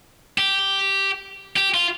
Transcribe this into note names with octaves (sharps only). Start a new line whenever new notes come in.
G4
G4
F4